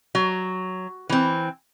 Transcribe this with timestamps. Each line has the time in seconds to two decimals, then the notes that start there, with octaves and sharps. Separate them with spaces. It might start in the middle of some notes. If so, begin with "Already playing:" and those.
0.15 F#3
1.09 E3 C4